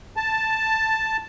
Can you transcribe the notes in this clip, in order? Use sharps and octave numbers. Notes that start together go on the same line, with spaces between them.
A5